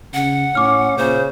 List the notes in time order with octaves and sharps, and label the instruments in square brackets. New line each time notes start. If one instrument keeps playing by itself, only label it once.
[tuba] C#3 [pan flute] F#5
[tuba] A2 [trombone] C#4 [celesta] D6 F6
[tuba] A#2 [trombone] C#3 [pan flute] C5